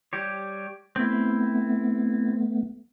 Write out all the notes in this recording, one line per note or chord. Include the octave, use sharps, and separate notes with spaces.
G3 G4 C#5
A3 B3 C4 E4